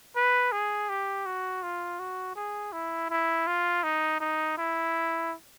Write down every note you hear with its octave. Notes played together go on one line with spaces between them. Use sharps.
B4
G#4
G4
F#4
F4
F#4
G#4
E4
E4
F4
D#4
D#4
E4